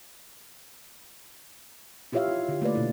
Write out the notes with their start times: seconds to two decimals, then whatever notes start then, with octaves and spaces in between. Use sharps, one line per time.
2.12 E4 F4 G4 C#5 E5 F5
2.28 D#4
2.48 D3 G4
2.62 A3 A#3 B4 D5
2.75 B2 D4 E4